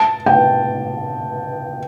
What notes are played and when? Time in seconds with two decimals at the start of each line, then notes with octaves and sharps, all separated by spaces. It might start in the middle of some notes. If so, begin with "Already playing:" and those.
Already playing: A5
0.26 G5